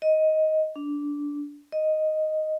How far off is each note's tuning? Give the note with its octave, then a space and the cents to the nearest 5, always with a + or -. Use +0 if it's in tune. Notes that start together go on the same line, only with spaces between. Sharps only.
D#5 +10
D4 -15
D#5 +0